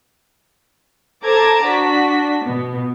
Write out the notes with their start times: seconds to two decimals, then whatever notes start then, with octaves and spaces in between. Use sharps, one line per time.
1.23 A4 C5 A5 A#5 D6 G#6
1.62 D4 F#4 B6
2.44 B2 B3